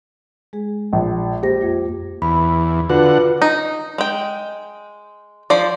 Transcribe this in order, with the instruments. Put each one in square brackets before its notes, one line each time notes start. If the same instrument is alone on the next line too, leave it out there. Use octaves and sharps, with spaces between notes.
[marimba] G#3 G#4
[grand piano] A#1
[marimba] A#3 C5 A#6 [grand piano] G4
[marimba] F2 A#3 F4
[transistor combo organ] E2 [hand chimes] B5
[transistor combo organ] D3 F#5 [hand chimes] F4 F#4 B4
[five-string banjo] D#4
G#3 G5
F3 C5 D5